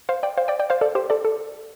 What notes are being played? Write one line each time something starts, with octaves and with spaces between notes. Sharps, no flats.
C5 F5
D5 G5
C5 F5
D5 G5
D5 G5
C5 F5
A4 D5
G4 C5
A4 D5
A4